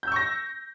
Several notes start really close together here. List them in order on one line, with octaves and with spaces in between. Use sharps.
G6 E6 C#6 A#6